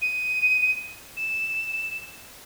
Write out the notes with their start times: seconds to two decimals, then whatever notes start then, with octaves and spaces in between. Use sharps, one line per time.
0.01 D#7
1.17 E7